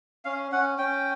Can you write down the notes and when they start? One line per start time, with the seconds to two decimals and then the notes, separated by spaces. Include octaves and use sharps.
0.25 C#4 F5
0.52 C#4 F#5
0.78 C#4 G5